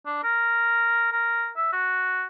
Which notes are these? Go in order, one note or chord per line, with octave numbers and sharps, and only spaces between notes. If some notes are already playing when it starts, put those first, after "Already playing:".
D4
A#4
A#4
E5
F#4